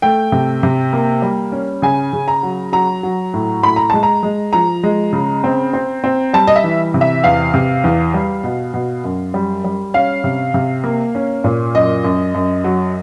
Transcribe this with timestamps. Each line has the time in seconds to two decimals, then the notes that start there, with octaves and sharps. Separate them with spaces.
0.02 A3 G5
0.32 C3
0.63 C3
0.93 A#3
1.22 G3
1.52 C#4
1.82 C#3 G#5
2.13 C#3
2.28 A#5
2.43 F#3
2.72 F#3 A#5
3.03 F#3
3.34 A2
3.63 A2 B5
3.76 A#5
3.90 G#3 A5
4.03 A#5
4.23 G#3
4.53 F3 A#5
4.83 G#3
5.13 C#3
5.44 C4
5.73 C4
6.04 C4
6.33 G3 A5
6.47 D#5
6.56 E5
6.64 E3
6.94 C3
7.01 E5
7.24 E2 F5
7.54 C3
7.84 E2
8.14 G3
8.44 B2
8.74 B2
9.04 F#2
9.34 G3
9.64 G3
9.94 C#4 F5
10.24 C3
10.54 C3
10.84 A#3
11.15 C#4
11.44 A#2
11.74 F#2 D#5
12.04 F#2
12.34 F#2
12.64 F#3